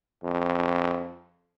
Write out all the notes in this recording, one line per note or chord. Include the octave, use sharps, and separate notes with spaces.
F2